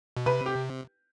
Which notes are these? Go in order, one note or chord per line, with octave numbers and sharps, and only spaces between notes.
B2
C3 B4
G4